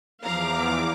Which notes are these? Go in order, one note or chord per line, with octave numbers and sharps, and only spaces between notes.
E2 F3 F5 A#5 D6